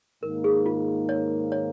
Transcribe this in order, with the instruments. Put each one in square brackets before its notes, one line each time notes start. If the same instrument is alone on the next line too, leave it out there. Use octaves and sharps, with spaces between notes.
[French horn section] G#2 D#3 A#3 [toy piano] A#4
[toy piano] G#4
F4
C#5
C#5